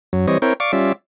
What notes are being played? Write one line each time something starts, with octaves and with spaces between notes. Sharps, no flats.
F#2 F#3
E3 G3 C4 C#5 D#5
C4 E4 A#4 C#5 G5
D5 F5 C#6 D6
G3 C#4 F4 D5 E5